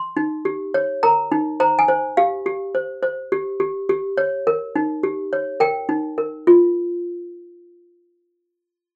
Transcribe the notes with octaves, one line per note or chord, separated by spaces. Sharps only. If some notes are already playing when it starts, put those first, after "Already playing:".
Already playing: C6
D#4
G4
C#5
A#4 A#5
D#4
C5 A#5
G#5
C5
G4 F5
G4
C5
C5
G4
G4
G4
C#5
A#4
D#4
G4
C#5
A#4 G5
D#4
A#4
F4